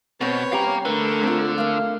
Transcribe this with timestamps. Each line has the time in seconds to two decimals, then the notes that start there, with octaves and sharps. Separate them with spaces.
0.21 B2 B3 C4 B4 C#5
0.52 C2 C#4 G4 F5 A#5
0.85 D3 A3 A#4 B4
1.23 C4 F4
1.58 A3 A#3 F5